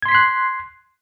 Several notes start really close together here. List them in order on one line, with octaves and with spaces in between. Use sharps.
G#6 C6 B6 C7 F#6